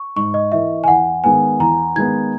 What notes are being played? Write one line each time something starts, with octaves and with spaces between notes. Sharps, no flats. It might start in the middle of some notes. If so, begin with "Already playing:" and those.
Already playing: C#6
G#2 C#6
D#5
E3 A#3 E5
G#5
E2 F#5
D#3 G#3 B3 G#5
E2 A#5
D#3 G#3 B3 G#6